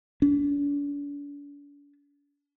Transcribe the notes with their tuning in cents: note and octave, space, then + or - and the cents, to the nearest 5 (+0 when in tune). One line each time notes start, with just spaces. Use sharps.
D4 -45